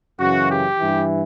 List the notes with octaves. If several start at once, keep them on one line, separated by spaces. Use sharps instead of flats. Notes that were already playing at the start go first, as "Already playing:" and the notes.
F#2 C#3 E3 F#4
G4
G2 E3